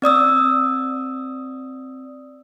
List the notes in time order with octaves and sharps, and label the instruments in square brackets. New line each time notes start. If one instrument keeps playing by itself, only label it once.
[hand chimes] C4 D5 D#6 E6